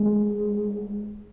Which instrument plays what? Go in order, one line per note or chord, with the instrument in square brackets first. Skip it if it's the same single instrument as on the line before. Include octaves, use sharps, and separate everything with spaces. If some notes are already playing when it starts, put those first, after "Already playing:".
Already playing: [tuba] G#3